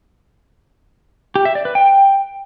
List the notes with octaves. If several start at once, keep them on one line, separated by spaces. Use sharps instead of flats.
G4
E5
D5
B4
G5